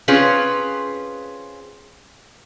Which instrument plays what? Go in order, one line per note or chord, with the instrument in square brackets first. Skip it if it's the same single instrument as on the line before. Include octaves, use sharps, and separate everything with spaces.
[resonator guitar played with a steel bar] C4 C#4 F4 G#4 B4